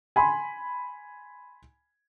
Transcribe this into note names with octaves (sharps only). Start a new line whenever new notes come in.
G#5 B5 C6